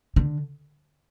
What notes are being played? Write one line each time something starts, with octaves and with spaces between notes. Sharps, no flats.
D3